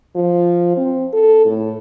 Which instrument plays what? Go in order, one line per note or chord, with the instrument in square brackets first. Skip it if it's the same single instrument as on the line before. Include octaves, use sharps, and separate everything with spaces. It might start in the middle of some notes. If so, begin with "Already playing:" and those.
[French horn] F3
C4
A4
A2